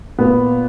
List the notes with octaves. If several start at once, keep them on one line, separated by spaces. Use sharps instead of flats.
A#2 B3